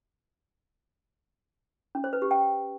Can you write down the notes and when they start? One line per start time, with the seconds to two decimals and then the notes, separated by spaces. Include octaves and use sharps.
1.95 C#4
2.04 C5
2.13 B4
2.22 G4
2.31 G5